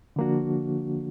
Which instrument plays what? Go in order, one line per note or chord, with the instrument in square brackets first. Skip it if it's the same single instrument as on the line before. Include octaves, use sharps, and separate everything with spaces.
[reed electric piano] D3 F3 A#3 D4 F#4